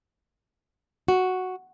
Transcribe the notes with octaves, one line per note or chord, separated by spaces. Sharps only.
F#4